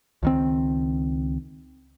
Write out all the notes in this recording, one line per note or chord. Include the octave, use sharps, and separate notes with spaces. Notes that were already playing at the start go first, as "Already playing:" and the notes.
C#2 D#3 C4